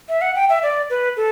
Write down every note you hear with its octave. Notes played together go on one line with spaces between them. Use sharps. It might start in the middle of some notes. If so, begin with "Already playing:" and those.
E5
F#5
G5
E5
D5
B4
A4